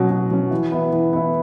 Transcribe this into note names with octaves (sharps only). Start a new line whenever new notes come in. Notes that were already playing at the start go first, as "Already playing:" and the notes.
Already playing: B2 F#3 C#4
B2
F#3 C#4
E3
B3 E4
E3
B3 E4